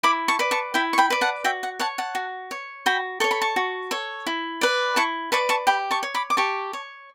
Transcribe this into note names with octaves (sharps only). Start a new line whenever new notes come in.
E4 B5 D6
A5 C#6
B4 D5
A5 C#6
E4 G5 B5
C#6
G5 B5
B4 D5
F#5 A5
F#4 E5 G5
F#5
C#5 F#5 A5
F#5 A5
F#4
C#5
F#4 G5 B5
A4 C#5 C#6
B5
A5 C#6
F#4
A4 C#5
E4
B4 D5
E4 A5 C#6
B4 D5 A5 C#6
A5 C#6
G4 G5 B5
A5 C#6
C#5
B5 D6
D6
G4 A5 C#6
C#5